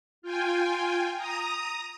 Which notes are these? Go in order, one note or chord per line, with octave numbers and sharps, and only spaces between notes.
F4 G5 G#5
A#5 D#6